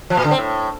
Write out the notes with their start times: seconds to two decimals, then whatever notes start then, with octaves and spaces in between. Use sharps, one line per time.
0.10 F3
0.17 A#2
0.24 D3
0.31 C4
0.38 A2